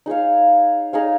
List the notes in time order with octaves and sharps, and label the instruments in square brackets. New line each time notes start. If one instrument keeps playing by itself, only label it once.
[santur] D#4 G#4 C#5 F5
D#4 G#4 C#5 F5